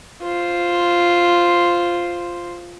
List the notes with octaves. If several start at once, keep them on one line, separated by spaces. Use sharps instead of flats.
F4 C5